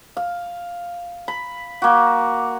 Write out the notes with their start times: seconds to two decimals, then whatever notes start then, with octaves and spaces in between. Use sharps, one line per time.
0.17 F5
1.28 B5
1.82 A#3 F#4